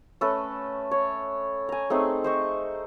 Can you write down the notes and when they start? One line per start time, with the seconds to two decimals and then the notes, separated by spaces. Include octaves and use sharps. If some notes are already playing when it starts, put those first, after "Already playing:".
0.21 A3 C#4 A4 B4
0.91 C#5
1.69 G#5 A#5
1.90 A3 C4 D#4 G#4
2.24 C5 D#5 C#6